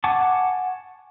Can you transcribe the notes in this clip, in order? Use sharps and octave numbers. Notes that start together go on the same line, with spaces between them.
F#5 G#5 A5 C#6 D6